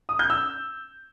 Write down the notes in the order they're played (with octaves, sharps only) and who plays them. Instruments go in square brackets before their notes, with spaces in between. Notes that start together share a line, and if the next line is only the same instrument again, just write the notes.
[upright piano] D#6
G6
E6